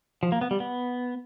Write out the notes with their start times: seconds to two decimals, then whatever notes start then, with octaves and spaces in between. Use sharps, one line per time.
0.23 F3
0.32 A#3
0.41 B3
0.51 G3
0.60 B3